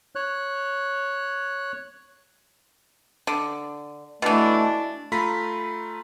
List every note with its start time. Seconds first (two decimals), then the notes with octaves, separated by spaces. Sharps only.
0.15 C#5 F#6
3.27 D3
4.22 B2 E3 A3 D4 E4
5.12 A3 F4 A#5 B5 B6